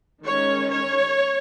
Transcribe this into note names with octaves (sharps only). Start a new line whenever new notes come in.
D#3 G#3 C#4 C#5
C#5